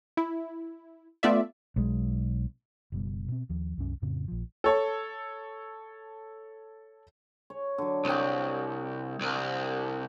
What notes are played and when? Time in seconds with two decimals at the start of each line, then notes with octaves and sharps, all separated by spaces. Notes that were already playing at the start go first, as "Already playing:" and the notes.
0.17 E4
1.23 A3 B3 F4 D5 E5
1.76 B1 G#3
2.92 F#1 B2 G3
3.28 B2 C4
3.49 D#2 F3
3.78 C2 F#2 C#4
4.02 F2 A2 C#3 C4
4.28 A#1 F3
4.64 A4 C#5 A5
7.50 C#5
7.78 D3 F#3
8.05 C2 C#5 G5
9.21 C2